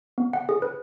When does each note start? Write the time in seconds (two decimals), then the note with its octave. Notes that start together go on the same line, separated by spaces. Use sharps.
0.18 B3
0.33 F#5
0.49 G#4
0.62 B4